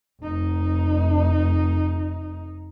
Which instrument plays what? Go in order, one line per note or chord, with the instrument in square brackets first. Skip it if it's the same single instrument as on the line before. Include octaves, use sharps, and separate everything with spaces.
[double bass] F1 D#4